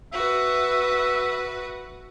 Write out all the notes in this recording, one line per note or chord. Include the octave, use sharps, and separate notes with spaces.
F#4 B4 E5